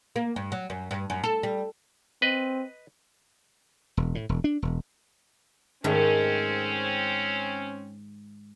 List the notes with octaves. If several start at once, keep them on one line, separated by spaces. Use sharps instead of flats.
A#3
G2
F#3
F#2
G2
F#2
A4
G3
C4 B4 D#5
E1
A2
E1
D4
E1
G#2 D#3 A3 C4 C#4